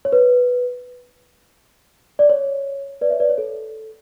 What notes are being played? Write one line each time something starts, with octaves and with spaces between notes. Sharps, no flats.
C#5
B4
D5
C#5
B4 D5
C#5 E5
B4 D5
C#5
A4